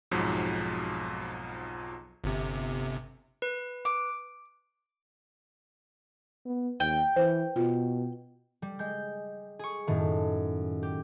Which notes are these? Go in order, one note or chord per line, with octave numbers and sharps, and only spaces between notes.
B1 F2 G#2 F3 F#3
G1 C3
B4
D6
B3
D#2 G5
E3 C5
B2 F4
G3
G#3 G6
G#4 C#6
F#2 A2 D#3
G4